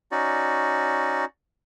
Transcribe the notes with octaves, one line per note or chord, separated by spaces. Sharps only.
C#4 D#4 F#4 D5